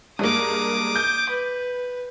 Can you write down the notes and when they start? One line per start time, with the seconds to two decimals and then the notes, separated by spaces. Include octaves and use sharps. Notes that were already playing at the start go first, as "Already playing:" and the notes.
0.19 G2 G#3 A#3 D6 D#6
0.96 G6
1.29 B4